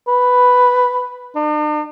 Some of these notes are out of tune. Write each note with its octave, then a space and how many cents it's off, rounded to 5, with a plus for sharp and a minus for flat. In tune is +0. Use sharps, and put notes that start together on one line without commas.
B4 +5
D4 +45